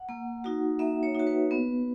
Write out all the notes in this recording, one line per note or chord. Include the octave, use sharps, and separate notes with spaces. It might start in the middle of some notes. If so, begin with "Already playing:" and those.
Already playing: F#5
A#3
D#4 F#4
A#3 E5
C#5
D#4 F#4
B4
B3